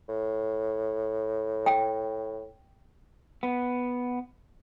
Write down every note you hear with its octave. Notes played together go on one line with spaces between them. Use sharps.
A2
G5
B3